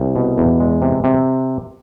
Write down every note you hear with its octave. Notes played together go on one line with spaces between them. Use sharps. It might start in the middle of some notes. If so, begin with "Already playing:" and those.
Already playing: C2
B2
E2
G#3
C3
C3